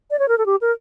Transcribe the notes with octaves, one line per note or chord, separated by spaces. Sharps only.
D5
C#5
A#4
A4
G4
A#4